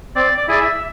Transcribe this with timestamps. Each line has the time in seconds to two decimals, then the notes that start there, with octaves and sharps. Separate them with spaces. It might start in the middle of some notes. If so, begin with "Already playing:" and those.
0.15 C4 D5
0.38 D5
0.48 E4 G#4 D5
0.60 E5